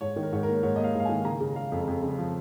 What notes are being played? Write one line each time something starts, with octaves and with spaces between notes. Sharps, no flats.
G#2 C#5
D#3
A#4
G#2 C#5
A#3 A#4
G#2 C#5
D#5
A#3
F5
G#2 F5
D#3 G#5
C#3 A#5
C#3
G#3 F5
F2
F2
C#3
F3